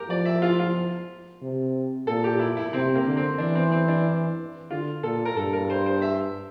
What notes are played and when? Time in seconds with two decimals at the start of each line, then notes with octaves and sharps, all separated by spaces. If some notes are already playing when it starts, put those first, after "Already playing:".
Already playing: G4 A#4
0.09 F3 D5
0.25 E5
0.42 F4
0.59 F4
1.42 C3
2.07 A#2 A4
2.24 G4
2.40 E4
2.57 E4
2.73 C3 C4
2.95 A#3
3.06 D3
3.17 C4
3.38 E3 D4
3.55 C4
3.72 C4
3.88 D4
4.71 D3 F4
5.03 A#2 A4
5.25 A#4
5.37 G2 A4
5.53 A#4
5.70 C5
5.86 C5
6.02 E5